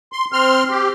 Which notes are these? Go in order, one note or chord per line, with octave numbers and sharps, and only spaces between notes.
C6
C4 C6 F6
G4